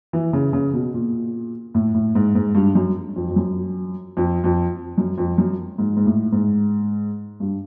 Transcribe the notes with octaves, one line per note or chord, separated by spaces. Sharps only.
E3
C#3
C#3
B2
A#2
A2
A2
G#2
G#2
G2
F#2
F2
F2
F#2
F2
F2
F#2
F2
F#2
G#2
G#2
A2
G#2
G2